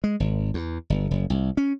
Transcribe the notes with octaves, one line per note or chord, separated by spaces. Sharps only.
G#3
G#1
E2
G1
F#1
C2
C#4